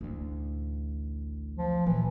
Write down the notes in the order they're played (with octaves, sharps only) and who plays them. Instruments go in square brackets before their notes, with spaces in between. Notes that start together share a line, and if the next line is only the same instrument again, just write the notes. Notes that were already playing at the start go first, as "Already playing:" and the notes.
[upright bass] A1 D2
[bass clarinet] F3
[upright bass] A#2 F3 [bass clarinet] E3